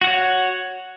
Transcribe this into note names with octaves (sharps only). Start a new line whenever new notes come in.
F#4 C#5 F#5